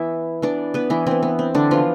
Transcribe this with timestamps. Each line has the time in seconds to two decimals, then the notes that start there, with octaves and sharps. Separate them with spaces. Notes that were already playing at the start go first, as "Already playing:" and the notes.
Already playing: E3 B3 E4 E5
0.42 E3 B3 D4 D5
0.74 B3 B4
0.90 E3 E4
1.06 E3 B3 C4
1.23 B3
1.39 C4
1.55 D3 D4
1.71 E3 F3 B3 F4